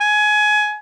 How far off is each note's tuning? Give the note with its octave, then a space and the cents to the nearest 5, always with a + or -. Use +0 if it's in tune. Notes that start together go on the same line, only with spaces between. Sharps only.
G#5 +20